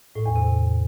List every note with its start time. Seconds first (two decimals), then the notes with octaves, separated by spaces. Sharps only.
0.15 A2
0.26 E2
0.36 C3